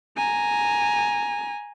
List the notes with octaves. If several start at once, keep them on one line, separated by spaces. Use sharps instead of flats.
G#5 A#5